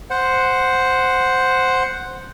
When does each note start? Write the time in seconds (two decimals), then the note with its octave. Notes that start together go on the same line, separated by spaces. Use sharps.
0.10 C5 F#5